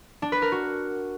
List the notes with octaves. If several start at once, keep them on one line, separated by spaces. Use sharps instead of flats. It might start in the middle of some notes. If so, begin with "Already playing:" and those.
D4
B4
A#4
F#4